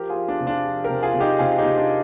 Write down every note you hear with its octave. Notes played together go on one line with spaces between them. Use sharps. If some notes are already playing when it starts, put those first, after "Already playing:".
Already playing: F3 G4 A#4
F4 G#4
F3
D4 F4
C3
D4 F4
F3
G4 A#4
C3
F4 G#4
C3
D#4 G4
C3 F4 G#4
D#4 G4
C3
D4 F4